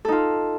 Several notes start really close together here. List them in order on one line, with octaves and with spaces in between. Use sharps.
A4 D#4 F4